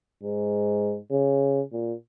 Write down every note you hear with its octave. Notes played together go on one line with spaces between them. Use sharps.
G#2
C#3
A#2